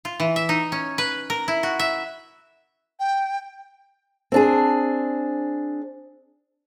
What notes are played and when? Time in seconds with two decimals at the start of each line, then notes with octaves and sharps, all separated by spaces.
0.05 F4
0.20 E3
0.36 E5
0.49 D#4
0.72 C#4
0.98 B4
1.30 A#4
1.48 E4
1.63 F#4
1.79 E5
3.00 G5
4.32 C4 D4 G#4